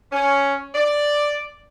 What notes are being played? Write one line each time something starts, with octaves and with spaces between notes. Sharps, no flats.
C#4
D5